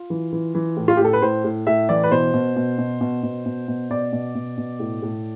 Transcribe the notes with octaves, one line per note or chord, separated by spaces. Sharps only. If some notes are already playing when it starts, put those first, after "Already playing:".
Already playing: F4
E3
E3
E3
A2
F4
A2 G4
A4
B4
A2 C5
A2
A2 E5
E3 D5
B4
B2 C5
B2
B2
B2
B2
B2
B2
B2
B2 D5
B2
B2
B2
A2
A2